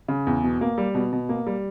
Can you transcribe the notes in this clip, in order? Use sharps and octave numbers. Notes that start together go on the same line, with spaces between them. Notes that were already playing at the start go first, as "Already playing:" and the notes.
C#3
E2
B2
A#3
G3
B2
B2
A#3
G3